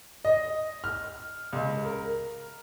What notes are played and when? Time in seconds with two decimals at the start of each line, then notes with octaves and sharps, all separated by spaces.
0.25 D#5
0.84 F6
1.53 C#2
1.85 A#4